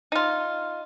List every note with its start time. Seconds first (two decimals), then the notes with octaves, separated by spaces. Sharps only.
0.12 D#4 F4